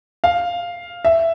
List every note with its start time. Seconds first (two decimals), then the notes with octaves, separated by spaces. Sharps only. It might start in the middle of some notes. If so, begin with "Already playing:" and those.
0.24 F5
1.05 E5